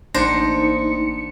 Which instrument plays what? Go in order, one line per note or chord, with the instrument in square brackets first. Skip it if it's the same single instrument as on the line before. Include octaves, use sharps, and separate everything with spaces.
[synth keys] A1 A#3 C#7 [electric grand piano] D4 A#6 [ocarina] D#4 [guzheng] C5